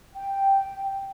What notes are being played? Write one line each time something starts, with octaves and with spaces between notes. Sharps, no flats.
G5